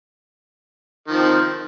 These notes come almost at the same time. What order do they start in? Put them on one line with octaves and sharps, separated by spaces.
D#3 F3 C4